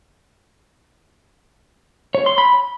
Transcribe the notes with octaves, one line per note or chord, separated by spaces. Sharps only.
C#5
C6
B5